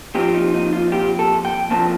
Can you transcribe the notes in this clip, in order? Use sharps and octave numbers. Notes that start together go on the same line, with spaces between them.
A#2 F3 C4 G4
D#4
D#4
F4
G4
A4
G5
C2 A#2 F3 C4 A5